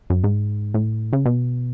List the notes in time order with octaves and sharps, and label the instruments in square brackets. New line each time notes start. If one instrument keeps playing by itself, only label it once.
[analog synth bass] F#2
G#2
A2
C#3
B2